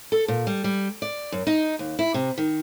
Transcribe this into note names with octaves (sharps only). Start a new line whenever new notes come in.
A4
A#2
G3
G3
D5
F#2
D#4
D#2
E4
C3
D#3